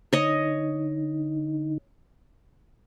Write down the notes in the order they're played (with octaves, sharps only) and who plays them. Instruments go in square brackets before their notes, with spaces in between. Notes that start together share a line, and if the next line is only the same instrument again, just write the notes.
[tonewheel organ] D3 D#4 [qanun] C#5 D#5